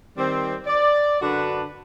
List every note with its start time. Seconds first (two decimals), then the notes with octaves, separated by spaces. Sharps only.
0.18 D#3 G3 C4
0.67 D5
1.21 F#2 D3 D4 F#4 B4